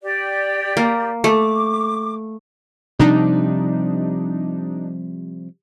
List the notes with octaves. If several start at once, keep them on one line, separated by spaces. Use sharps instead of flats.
G4 D5
A#3
A3 D6
C3 F3 G3 D4 D#4